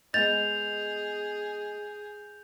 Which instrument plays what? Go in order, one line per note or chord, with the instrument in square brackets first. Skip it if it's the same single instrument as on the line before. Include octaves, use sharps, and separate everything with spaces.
[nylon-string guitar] G#3 B3 D#5 [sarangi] G#4 [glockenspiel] G6 F7 [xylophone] A6